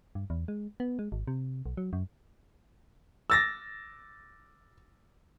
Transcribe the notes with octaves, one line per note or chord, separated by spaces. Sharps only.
G2
E2
G#3
B3
G#3
G#1
C3
B1
F#3
F#2
E6 A6 A#6